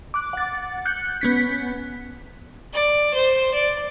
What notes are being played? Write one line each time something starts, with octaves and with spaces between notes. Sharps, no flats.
D6 F#6
F#5 A6
F#6 G6 C#7
B3 C#4 B6
D5
C5
D5